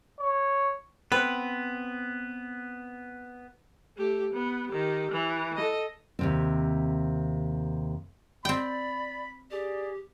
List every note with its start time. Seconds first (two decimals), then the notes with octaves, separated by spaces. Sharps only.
0.19 C#5
1.12 B3 C4 B4 F#5
3.97 A3 G4
4.33 B3
4.68 D#3 G4
5.12 E3
5.56 A4 D#5
6.19 D#2 C3 C4
8.45 C4 D5 G5 B5
9.51 G4 G#4 D5